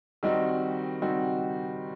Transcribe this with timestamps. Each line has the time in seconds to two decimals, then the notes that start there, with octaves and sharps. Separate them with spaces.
0.23 D#3 G3 C4 D#4 F#4
1.02 D#3 G3 C4 D#4 F#4